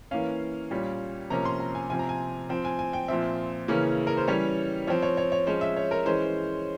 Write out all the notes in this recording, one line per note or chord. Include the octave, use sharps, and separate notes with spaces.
E3 A#3 C#4 F5
A#2 G3 C#4
C3 F3 A#3 C#4 A#5
C6
A#5
G#5
C3 F3 C4 G#5
A#5
G#5
F3 C4
G#5
G#5
G5
A#2 F3 C4 E5
C#3 E3 A#3 C#4
A#4
C5
E3 G3 C#4 C#5
F3 C4 C#5
C#5
C#5
C#5
F3 G#3 C#4 C5
E5
C#5
A#4
E3 G#3 C#4 C5